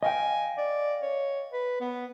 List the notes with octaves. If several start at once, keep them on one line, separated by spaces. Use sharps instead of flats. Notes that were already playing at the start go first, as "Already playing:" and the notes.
D#5 F5 G5 G#5
D5
C#5
B4
B3